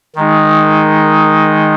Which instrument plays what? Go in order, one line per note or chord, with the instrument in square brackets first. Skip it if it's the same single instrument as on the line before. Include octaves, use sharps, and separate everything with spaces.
[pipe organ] D#3 G#3 D#4